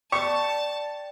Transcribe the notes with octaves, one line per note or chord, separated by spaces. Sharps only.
D5 G5 A5 C#6